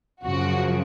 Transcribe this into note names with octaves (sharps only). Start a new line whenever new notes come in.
F#2 C#3 F3 F#4